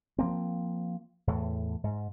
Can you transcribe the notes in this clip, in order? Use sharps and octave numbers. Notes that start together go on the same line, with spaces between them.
F3 A#3 C4
E2 A2
G#2